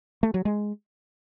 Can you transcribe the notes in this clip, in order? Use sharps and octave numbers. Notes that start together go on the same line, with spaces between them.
A3
F#3
G#3